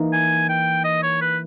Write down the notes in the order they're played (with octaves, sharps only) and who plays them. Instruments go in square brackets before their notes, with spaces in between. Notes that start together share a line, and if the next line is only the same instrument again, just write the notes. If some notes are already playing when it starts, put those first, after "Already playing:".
Already playing: [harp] E3 A#3 D#4
[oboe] G#5
G5
D#5
C#5
B4